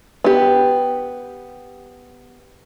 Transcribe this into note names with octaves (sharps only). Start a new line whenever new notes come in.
B3 G4